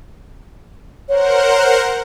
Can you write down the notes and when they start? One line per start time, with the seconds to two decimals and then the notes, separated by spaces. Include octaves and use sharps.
1.09 A#4 C5 C#5 F#5